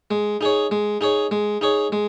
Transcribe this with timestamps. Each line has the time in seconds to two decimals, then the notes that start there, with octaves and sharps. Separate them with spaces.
0.11 G#3
0.41 D#4 G#4 C#5
0.71 G#3
1.01 D#4 G#4 C#5
1.31 G#3
1.61 D#4 G#4 C#5
1.92 G#3